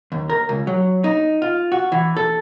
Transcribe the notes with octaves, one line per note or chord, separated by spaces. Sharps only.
D#2
A#4
C#2
F#3
D#4
F4
F#4
E3
A4